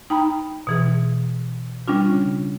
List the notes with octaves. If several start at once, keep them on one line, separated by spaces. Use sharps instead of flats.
D#4 G5 A#5 B5
B2 E3 G#4
G3 C#4 D4 F4
C#3